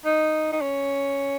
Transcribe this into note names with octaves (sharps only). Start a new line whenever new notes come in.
D#4
D#4
C#4